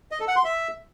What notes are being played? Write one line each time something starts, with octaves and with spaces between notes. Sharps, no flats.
D#5
A4
F#5
C6
E5